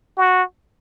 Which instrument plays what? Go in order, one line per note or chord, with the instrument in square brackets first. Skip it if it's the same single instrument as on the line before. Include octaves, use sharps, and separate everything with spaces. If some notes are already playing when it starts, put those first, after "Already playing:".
[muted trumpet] F#4